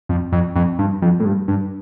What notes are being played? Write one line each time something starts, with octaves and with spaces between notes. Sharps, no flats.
F2
F2
F2
G2
F2
A2
G2
G2